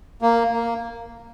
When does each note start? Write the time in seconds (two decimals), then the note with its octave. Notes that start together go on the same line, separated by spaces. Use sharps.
0.22 A#3
0.52 A#3